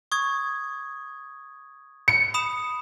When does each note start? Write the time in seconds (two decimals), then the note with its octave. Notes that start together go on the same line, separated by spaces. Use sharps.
0.12 C#6 D#6 G#6
2.08 C#7
2.34 B5 D#6 E7